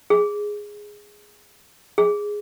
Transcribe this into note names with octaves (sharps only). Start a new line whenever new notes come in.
G#4
G#4